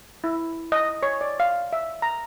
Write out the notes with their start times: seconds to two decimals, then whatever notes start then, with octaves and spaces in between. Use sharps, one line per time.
0.24 E4
0.72 D#5
1.03 C#5
1.21 D5
1.40 F5
1.73 E5
2.02 A#5